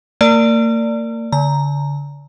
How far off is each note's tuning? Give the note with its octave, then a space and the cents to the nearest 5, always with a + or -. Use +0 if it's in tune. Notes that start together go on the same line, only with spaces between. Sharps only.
A#3 -40 A#4 -5 D5 +0
D3 -40 A#5 +0